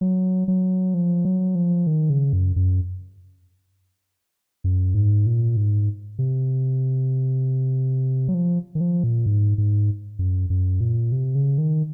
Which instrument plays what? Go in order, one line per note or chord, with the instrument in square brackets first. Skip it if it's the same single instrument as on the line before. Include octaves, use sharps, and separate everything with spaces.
[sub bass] F#3
F#3
F3
F#3
F3
D#3
C#3
F#2
F#2
F#2
G#2
A#2
G#2
C3
F#3
F3
D#3
F3
A#2
G#2
G#2
F#2
F#2
A#2
C3
C#3
D#3